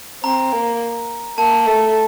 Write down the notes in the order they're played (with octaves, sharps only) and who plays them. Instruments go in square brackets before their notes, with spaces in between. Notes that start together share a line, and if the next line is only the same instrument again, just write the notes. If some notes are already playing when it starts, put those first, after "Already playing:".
[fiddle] C4 [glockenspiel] A#5
[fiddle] A#3
[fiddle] A#3 [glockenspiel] A5
[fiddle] A3